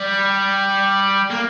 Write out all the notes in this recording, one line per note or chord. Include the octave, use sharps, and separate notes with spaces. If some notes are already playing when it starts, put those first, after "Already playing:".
Already playing: G3
A#3